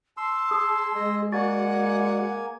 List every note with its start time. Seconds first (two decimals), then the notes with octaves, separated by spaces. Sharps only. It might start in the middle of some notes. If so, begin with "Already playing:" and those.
0.17 A5 C6 E6
0.51 G#4
0.95 G#3 D#5
1.32 A#3 F#4 D5 F#5 G#5